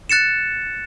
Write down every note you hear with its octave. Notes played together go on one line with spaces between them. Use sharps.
F#6 A6 C#7 E7